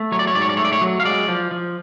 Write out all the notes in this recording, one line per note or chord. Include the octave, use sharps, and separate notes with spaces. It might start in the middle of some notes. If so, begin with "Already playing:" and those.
Already playing: A3
F#3 C#5
D5
C#5
G#2 D5
C#5
D5
A3 C#5
D5
C#5
F#3
F5
G#3 D5
F3
F3